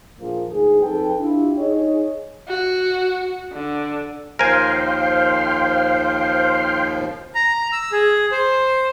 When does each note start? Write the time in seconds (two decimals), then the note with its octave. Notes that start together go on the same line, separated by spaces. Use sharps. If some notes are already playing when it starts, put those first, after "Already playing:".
0.19 A#1 F3 A#3 G#4
0.51 D2 G#2 G#4
0.82 F2 D#4 A4 B4 G5
1.20 D4 E4 F4 G4
1.58 D#4 G#4 C#5 D#5
2.48 F#4
3.53 D3
4.39 D#2 F3 A#4 C5 F5 G5 G#5 C6
7.35 A#5
7.72 E6
7.92 G#4
8.32 C5